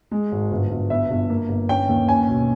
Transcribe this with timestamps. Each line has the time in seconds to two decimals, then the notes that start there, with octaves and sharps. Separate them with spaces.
0.11 G#3
0.32 G#1
0.51 G1
0.70 G1
0.90 B3 E5
1.10 G1
1.30 A#3
1.49 G1
1.69 C#4 G5
1.89 D#2
2.09 C#4 G#5
2.28 B1